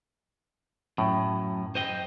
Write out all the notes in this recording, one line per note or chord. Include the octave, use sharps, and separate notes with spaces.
F#2 A2
C5 D#5 G5